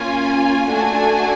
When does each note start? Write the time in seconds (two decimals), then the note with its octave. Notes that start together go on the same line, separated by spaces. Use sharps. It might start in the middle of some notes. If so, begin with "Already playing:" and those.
Already playing: A#3 C#4 F4 G#5
0.68 A3 D4 F#4 A4